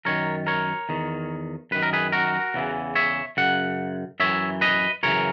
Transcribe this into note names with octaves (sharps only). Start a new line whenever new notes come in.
F#2 D#3 A#4 C#5
A#4 C#5
E2 D#3
F#2 D#3 B4
A#4
G#4 B4
F#4 A#4
E2 C#3 E3
C#5 E5
F#2 C#3 F#5
F#2 E3 C#5 E5
B4 D#5
F#2 C#3 E3 A#4 C#5